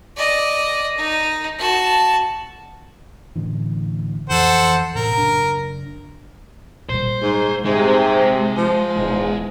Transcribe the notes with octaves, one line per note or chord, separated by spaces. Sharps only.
D5 D#5
D#4
F#4 A5
A2 D3 E3
F2 E3 A4 C5 F#5
A2 C3 A#4
F#1 D4
A#2 G3 C5
G#2 D#4
G#2 C3 G#3
F3
D#1 E2 G#2